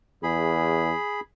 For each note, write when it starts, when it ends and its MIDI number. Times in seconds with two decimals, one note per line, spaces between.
0.23 0.93 40
0.23 1.20 68
0.23 1.20 83